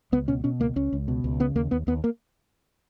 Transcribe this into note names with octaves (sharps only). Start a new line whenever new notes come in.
C#2 B3
B2 C#4
B2 C#4
C#2 A#3
C#2 C#4
C#2
B2
C#2
C#3 B3
D#2 A#3
D#2 B3
D#2 B3
A#3